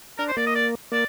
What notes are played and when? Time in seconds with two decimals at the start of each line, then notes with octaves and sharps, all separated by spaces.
0.18 D4 A#4
0.28 C5
0.37 A#3 D5
0.47 D#5
0.55 D5
0.92 A#3 D5